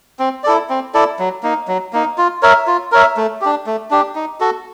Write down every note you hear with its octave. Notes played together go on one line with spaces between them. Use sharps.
C4
E4 A4 D5
C4
E4 A4 D5
F#3
A#3 D#4
F#3
A#3 D#4
F4
A#4 C#5 E5
F4
A#4 C#5 E5
A3
D4 G4
A3
D4 G4
D#4
F#4 A4